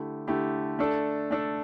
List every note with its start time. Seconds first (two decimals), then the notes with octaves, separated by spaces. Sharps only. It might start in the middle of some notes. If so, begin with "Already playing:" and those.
Already playing: D3 A3 E4 G4
0.27 D3 A3 E4 G4
0.79 A3 D4 A4
1.31 A3 D4 A4